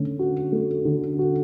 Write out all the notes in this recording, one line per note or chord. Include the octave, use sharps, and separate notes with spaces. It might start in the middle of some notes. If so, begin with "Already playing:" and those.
Already playing: D3 A3 C#4
F#4
A3
D3
F#4